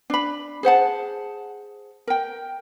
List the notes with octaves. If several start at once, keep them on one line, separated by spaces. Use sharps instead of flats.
D4 B5
G#4 C5 F#5 A5
A#4 G5